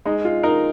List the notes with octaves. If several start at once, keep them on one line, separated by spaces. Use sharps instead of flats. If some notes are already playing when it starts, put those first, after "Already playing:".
G#3 D#4
F4
D#4 A#4